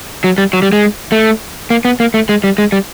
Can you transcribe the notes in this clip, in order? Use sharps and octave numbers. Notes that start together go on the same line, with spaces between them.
F#3
G3
F#3
G3
G#3
A3
A#3
B3
A#3
A3
G#3
G3
G#3
G3